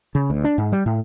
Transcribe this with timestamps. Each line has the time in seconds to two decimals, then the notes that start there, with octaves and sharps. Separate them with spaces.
0.15 C#3
0.30 D2
0.44 D4
0.58 G#2
0.72 G3
0.86 A2